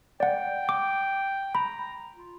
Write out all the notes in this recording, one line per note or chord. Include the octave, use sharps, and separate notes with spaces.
D5 F#5 G5
D6
A#5 B5
F4